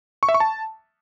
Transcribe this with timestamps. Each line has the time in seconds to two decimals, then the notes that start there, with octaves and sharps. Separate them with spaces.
0.23 C#6
0.29 E5
0.34 C#6
0.40 A5